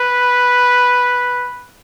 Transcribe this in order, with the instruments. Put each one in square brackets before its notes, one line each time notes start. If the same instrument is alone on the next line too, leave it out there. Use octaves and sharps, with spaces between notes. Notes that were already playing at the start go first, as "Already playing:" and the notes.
Already playing: [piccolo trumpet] B4